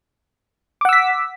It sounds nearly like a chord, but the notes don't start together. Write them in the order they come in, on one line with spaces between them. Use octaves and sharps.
D6 F#5 E6 B6